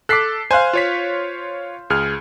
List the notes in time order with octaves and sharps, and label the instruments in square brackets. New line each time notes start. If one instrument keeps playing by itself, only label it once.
[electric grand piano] A4 D6 [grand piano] F#6 B6 C7
[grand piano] C5 F5 [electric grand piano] G#5 F#6
[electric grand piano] F4 C#5 B6
C#2 G#4 F6